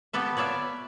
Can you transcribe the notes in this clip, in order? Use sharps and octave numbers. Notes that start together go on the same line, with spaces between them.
B3 G4 A4 B4 E5
B4 C#5 D5 E5 F5